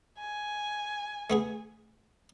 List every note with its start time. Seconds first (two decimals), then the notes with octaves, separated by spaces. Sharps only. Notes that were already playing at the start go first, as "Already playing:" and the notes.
0.19 G#5
1.30 A3 B3 G#4